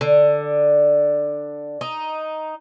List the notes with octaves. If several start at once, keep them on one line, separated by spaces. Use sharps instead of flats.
D3
D#4